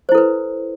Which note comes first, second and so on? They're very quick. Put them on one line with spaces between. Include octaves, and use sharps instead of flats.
C5 E4 A4 B4